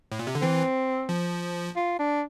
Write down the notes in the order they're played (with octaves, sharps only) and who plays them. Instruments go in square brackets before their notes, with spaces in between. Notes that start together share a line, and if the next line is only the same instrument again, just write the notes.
[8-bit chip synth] A2
A#2
C3
D3
[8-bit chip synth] E3 [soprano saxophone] C4
[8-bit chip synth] F3
[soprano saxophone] F4
D4